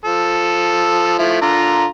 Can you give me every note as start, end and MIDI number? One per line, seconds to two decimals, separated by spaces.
0.05 1.15 53
0.05 1.15 69
1.19 1.40 53
1.19 1.40 57
1.19 1.40 64
1.41 1.86 50
1.41 1.86 65
1.41 1.86 82